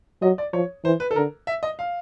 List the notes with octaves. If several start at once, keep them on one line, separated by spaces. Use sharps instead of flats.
F#3 D#5
D5
F3 C#5
E3 C5
B4
A4
D3 A#4
E5
D#5
F5